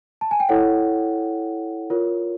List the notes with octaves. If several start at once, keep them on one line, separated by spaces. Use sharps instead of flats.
A5
G#5
G5
E4 A4 C#5 F#5
F4 A#4 C#5